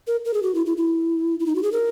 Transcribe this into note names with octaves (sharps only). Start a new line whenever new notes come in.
A#4
A#4
G#4
F#4
E4
E4
E4
E4
D#4
F#4
G#4
A#4